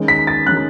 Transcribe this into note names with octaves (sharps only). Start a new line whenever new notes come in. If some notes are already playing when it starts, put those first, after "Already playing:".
Already playing: D#3 G#3 C#4
B6
A6
D#3 G#3 C#4 F#6